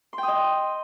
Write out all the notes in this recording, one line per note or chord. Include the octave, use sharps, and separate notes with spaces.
C6
G5
D#6
D#5
C6